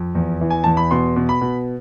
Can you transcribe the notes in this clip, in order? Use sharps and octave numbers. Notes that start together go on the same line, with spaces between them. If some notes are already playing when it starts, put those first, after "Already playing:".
Already playing: F2
E2
E3
G#5
E2 A5
B5
B2 C6
B2
B5
B2